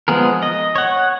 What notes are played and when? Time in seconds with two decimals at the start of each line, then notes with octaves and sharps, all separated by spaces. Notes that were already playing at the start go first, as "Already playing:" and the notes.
0.08 F3 G#3 B3 G#4 A#4
0.43 D#5
0.76 C#5 F#5